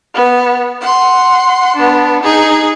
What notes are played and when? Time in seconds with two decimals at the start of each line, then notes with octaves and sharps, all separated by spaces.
0.14 B3
0.81 F#5 C6
1.75 B3 D4
2.23 D#4 G#4